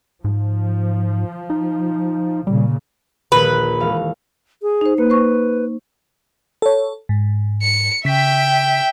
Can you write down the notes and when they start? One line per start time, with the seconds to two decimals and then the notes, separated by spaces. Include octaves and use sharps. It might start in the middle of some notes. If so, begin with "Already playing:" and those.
0.24 G#2 F3
1.50 D#4
2.47 A#2 C#3 G3
3.32 A#1 D#2 B4
3.80 E1 F5
4.62 G#4
4.81 D#4 C5
4.98 A#3 B4
5.10 C5 C#6
6.62 A4 C#5
7.09 G#2
7.63 C#7
8.05 C#3 E5 G5 B6